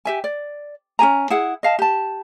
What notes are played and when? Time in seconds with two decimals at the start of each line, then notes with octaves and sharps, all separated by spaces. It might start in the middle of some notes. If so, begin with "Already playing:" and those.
0.05 G4 E5 G#5
0.24 D5
0.99 C#4 G4 G#5 A#5
1.30 E4 G#4 F#5
1.63 D#5 F5 A5
1.79 G4 A5